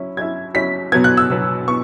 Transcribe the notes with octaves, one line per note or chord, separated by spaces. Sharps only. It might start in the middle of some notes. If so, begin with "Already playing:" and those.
Already playing: F#3 C#4 E4
F#3 C#4 E4 G#6
F#3 C#4 E4 B6
B2 F#3 B3 G#6
F#6
E6
B2 F#3 B3
B3 C#6